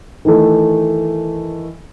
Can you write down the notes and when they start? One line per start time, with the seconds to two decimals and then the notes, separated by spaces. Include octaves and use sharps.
0.25 D#3 E3 A3